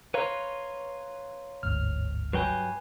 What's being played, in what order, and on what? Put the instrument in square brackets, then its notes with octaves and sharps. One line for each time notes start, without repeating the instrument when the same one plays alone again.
[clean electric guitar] B4 C#5 [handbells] F5 A#5 C6
[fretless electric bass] G1 D2 G#2 [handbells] F6
[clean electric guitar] G2 F#3 G5 [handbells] B4 G#5